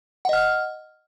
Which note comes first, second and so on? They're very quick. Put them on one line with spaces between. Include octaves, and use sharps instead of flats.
F#5 D#5 F6